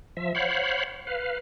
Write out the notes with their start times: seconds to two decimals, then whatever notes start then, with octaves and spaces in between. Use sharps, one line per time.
0.17 F3 E5
0.35 C5 C#5 F5 F#5 B5
1.07 B4 F5